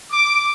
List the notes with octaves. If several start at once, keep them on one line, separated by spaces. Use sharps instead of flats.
D6